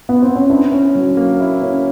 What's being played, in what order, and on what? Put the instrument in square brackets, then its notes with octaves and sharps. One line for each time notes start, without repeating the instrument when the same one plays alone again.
[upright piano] B3
C4
C#4
[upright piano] D4 [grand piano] E4
[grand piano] C#4
F#3
A#3
E4
C#4